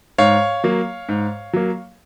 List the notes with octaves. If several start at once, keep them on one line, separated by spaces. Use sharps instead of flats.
G#2 C#5 F5
F#3 A#3
G#2
F#3 A#3